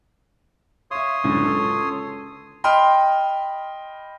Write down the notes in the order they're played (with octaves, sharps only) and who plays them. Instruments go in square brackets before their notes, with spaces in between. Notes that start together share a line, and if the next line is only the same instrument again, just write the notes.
[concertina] C#5 C6 D#6 [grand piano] E5 F5
[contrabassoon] C#2 [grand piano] F#2 A2 D3
[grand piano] A4
D#5 G5 B5 C6 F6